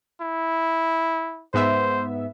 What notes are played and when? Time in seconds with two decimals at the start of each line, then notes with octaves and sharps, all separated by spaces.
0.21 E4
1.54 G#2 B3 C5 E5